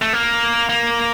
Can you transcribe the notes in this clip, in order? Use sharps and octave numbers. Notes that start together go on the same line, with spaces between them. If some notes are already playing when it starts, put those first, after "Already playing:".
A3
A#3
A#3